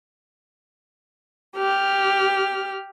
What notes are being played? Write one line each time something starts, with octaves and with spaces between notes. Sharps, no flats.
G4 F6